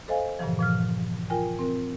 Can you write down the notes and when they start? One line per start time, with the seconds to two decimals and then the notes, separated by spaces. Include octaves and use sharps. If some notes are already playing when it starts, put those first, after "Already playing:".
0.08 A4 C5 D#5 F5 G#5
0.39 G2 A#2 C#3 E3 F3
0.59 A#2 F3 F6
1.30 F4 A#4 G5 G#5
1.59 C4 A#4